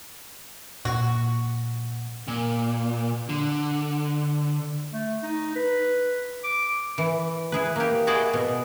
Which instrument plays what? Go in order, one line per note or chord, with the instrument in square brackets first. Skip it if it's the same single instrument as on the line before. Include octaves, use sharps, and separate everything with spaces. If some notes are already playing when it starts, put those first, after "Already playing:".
[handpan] A#2 [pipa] F#4
[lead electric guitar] A#2
D3
[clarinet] A3
D#4
B4
D6
[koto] E3
E4 G#4 B4
A#3 G4
E4 F#4 G#4 D5 D#5
B2